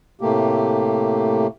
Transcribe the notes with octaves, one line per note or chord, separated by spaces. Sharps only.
A2 C3 A3 A#3 G4